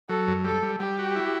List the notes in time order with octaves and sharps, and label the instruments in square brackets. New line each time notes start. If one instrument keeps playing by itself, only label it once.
[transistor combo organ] F#3 [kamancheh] A4
[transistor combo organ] F#2
[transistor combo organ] G3 [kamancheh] A4
[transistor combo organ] G3
[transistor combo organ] G3 [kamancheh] G4
[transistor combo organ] F#4
E4